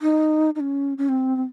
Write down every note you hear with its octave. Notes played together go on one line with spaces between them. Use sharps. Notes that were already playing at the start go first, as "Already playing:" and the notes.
D#4
D#4
C#4
C#4
C4
C4